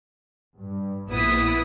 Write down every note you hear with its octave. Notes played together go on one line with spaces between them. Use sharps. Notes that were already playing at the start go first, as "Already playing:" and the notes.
G2
A#1 B3 E4 D#6 B6